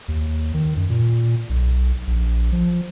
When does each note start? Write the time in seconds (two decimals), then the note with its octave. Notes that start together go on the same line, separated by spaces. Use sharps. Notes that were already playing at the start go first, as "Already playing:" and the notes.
0.08 D#2
0.54 D#3
0.76 F#2
0.89 A#2
1.49 B1
2.07 A#1
2.52 F3